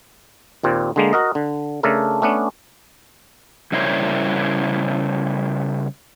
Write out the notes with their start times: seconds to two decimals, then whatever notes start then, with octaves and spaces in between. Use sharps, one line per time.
0.63 D#2 A#2 C4
0.96 D3 G#3 A#3
1.13 F#4 A#4 D#5
1.35 D3
1.83 C#3 A3 D4 A4 A#4
2.22 A3 B3 C#4 D4
3.72 C#3 G3 E4 A#4 C5 C#5